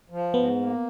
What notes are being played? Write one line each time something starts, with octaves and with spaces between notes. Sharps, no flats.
F3
G#2 B3
A#3